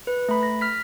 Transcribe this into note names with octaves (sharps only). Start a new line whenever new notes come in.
B4
A3 B5
A#6
F6 B6